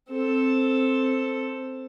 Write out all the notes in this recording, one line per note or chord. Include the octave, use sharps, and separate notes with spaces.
C4 A4